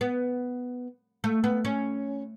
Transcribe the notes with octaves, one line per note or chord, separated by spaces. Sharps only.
B3
A3
B3
C#4